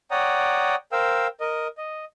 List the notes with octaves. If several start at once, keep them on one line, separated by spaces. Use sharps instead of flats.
C#5 D5 F#5 G5 A#5 D#6
A#4 C5 F5 G5 E6
A#4 D#5
D#5